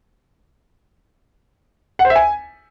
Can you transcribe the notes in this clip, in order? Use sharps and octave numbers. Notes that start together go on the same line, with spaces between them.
F#5
C5
E5
G#5